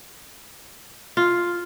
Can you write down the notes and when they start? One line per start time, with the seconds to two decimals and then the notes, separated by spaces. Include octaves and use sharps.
1.17 F4